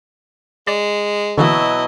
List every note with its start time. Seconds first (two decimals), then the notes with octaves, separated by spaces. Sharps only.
0.67 G#3 D5
1.37 B2 D3 E3 F#3 A#3 E4 B4 D#5